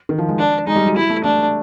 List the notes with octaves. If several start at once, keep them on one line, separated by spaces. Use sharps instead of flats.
D#3
F3
G#3
D4
G#3 D#4
G3
F#3
G3 E4
A3
A3 D4